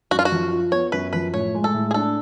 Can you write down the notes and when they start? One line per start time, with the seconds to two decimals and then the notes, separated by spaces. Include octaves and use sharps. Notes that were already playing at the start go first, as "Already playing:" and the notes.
0.11 F#2 F#4
0.19 F4
0.25 F#4
0.32 F3
0.52 F4
0.72 B3 C#5
0.92 F#2 B4
1.13 F3 B4
1.34 A2 C#5
1.54 G#3
1.64 A4
1.74 A2
1.91 G#4
1.94 D4 A4